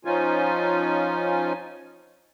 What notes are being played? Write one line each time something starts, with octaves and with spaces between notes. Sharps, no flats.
F3 C#4 D#4 F4 G#5